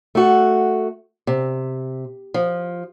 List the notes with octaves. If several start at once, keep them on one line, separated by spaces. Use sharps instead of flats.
A3 F#4
C3
F3